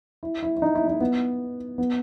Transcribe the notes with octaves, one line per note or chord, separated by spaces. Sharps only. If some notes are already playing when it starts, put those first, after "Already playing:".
E4
E4
E4
D#4
E4
D#4
B3
B3